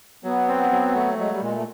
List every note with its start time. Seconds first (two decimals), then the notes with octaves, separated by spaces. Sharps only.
0.24 F#3 B3
0.48 C4
0.72 F#3
0.95 A3
1.18 F#3 G#3
1.31 G3
1.42 A#2 G#3
1.54 A3